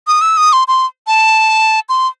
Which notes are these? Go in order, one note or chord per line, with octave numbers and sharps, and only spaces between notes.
D#6
E6
D#6
C6
C6
A5
C6